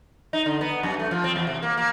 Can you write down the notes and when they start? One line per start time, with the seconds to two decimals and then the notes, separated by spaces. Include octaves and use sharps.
0.33 D#4
0.46 D3
0.61 B3
0.83 F#2
0.99 A3
1.11 F3
1.24 C4
1.36 E2
1.47 C3
1.63 A#3
1.77 A#3